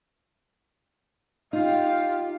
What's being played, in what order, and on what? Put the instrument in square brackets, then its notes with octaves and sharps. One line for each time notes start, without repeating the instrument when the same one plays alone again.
[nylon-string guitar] D#4 [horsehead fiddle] F4 G4